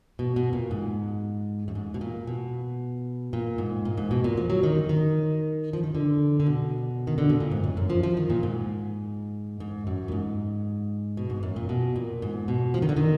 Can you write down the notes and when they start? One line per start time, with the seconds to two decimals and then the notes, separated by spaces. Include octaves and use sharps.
0.19 B2
0.36 B2
0.53 A#2
0.71 G#2
1.68 F#2
1.75 G#2
1.94 B2
2.01 A#2
2.27 B2
3.33 A#2
3.58 G#2
3.85 A#2
3.97 G#2
4.11 B2
4.24 A#2
4.37 F3
4.50 F#3
4.63 D#3
4.89 D#3
5.73 F3
5.84 D#3
5.95 D3
6.40 D3
6.46 B2
7.07 D#3
7.18 D3
7.30 B2
7.40 A#2
7.52 G#2
7.64 F#2
7.77 F#2
7.90 F3
8.03 F3
8.17 D#3
8.30 A#2
8.43 G#2
9.60 G#2
9.87 F#2
10.08 A#2
10.12 G#2
11.17 B2
11.30 G#2
11.43 F#2
11.56 A#2
11.69 B2
11.96 A#2
12.22 G#2
12.48 B2
12.74 F3
12.82 D#3
12.89 D3
12.97 D#3